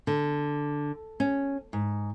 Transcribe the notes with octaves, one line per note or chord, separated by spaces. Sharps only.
D3
C#4
G#2